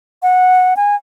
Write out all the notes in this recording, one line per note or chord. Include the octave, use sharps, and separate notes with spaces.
F#5
G#5